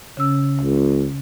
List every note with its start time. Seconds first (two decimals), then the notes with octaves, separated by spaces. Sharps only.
0.17 C#3 C#4 E6
0.61 C#2